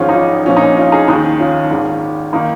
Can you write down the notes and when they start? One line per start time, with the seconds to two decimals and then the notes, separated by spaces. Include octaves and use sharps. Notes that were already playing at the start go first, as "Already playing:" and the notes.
Already playing: G#1 G#2 F3 C#4 F4
0.09 D#4
0.15 C#4 F4
0.46 A#1 A#2 F3 C#4
0.57 D#4
0.62 C#4
0.77 C#4 F4
0.92 D#4 G#4
1.08 D#2 D#3 D#4 G#4
1.40 C#4 F4
1.70 G#1 G#2 D#3
2.33 D#3 A#3 D#4